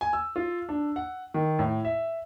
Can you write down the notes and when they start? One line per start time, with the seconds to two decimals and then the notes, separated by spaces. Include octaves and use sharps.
0.01 G#5
0.13 E6
0.36 F4
0.69 D4
0.96 F#5
1.34 D#3
1.59 A2
1.85 E5